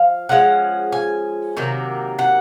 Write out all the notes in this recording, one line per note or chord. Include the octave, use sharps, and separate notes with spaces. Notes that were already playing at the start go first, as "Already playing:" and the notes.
Already playing: F3 F5
F3 G#3 C#4 F#5
G#5
C3 D#3 F#3 A#3
F#5